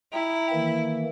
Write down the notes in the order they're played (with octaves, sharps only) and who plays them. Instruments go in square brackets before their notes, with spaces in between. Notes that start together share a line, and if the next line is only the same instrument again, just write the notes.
[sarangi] E4 [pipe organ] G5 A#5
[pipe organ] D#3 E3 A#3